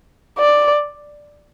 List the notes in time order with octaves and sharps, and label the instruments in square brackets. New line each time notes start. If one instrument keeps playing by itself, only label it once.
[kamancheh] D5